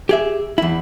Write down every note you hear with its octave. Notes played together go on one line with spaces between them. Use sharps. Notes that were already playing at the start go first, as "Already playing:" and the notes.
G4 G#4 E5
E2 E4